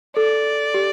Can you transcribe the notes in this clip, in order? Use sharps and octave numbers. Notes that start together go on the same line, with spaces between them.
A4 D5
G4